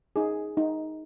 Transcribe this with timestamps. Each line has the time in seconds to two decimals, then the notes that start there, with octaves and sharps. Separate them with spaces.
0.16 D#4 G#4
0.57 D#4